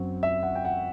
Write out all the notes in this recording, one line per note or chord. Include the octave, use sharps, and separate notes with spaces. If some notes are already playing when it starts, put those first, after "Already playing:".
Already playing: F#2 F#3 C4
E5
F#5
G5
F#5